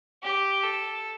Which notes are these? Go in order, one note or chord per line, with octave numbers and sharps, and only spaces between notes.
G4
A4